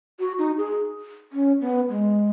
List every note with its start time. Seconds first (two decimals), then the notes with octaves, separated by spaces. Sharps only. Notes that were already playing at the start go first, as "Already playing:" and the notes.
0.20 F#4
0.39 D#4
0.58 G#4
1.33 C#4
1.61 B3
1.89 G#3